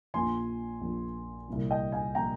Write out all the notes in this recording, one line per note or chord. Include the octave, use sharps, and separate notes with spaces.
A#1 A#2 F3 G#5 C6
A#1 A#2 F3
C2 A#2 F3
D#5 G5
F5 G#5
A#2 F3 G5 A#5